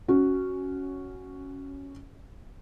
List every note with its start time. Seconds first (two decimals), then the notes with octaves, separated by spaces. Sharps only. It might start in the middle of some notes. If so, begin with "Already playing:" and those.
0.08 C#4 F#4